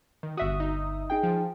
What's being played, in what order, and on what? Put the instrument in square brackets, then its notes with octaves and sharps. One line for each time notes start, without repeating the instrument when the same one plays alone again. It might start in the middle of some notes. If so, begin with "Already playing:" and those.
[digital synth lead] D#3
[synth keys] G1 E5 D#6 [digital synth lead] F#4
[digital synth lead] D#4
[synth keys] D#4 G#4 G5
[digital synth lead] F3